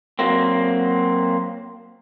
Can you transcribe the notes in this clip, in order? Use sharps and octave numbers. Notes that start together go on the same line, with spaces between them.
F#3 A#3 C4